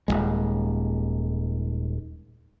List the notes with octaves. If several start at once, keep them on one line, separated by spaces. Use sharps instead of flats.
D#1 E2 G#3